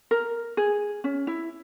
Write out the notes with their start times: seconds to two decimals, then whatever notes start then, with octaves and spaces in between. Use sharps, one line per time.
0.11 A#4
0.57 G#4
1.04 C#4
1.27 E4